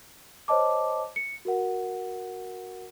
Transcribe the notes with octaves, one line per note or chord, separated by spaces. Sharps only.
C5 C#5 D#5 A5 D6
C#7
F#4 A#4 F#5